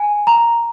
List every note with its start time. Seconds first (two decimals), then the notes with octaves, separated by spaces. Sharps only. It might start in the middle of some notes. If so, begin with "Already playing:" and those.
Already playing: G#5
0.27 A#5